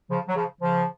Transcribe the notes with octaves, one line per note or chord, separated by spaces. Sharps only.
C#3 F3
F#3
C#3 F3
C#3 F3